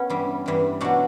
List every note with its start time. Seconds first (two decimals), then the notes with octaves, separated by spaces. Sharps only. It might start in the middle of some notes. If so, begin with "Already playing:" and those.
Already playing: B3 C#4
0.10 G2 E3 G3
0.46 G2 E3 G3
0.81 B2 F#3 D4 F#4